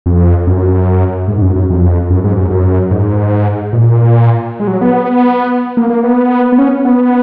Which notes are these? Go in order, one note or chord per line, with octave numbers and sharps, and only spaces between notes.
F2
F#2
G#2
G#2
F#2
F#2
F2
F#2
G#2
F#2
F#2
G#2
A#2
G#3
F#3
B3
A#3
A#3
B3
B3
C#4
B3